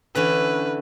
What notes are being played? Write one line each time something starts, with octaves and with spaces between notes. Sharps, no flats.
D3 E3 C#4 B4